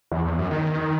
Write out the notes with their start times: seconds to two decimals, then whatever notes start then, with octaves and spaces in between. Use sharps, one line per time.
0.12 E2
0.25 E2
0.38 F#2
0.51 D#3